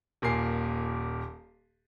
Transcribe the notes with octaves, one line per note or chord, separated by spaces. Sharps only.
D#1 A#2 A#4 G#5 C7